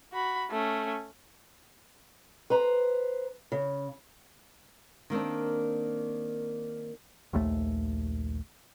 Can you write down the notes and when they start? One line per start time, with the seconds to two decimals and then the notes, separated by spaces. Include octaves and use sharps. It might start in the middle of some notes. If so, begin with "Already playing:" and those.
0.13 F#4 B5
0.51 A3 C#4
2.50 B4 C5 A#5
3.52 C#3
5.10 D#3 A#3 C4 D4
7.33 A#1 D#2 A3